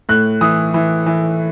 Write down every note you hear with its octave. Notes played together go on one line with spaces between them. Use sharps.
A2 F#6
E3 D#6
E3
E3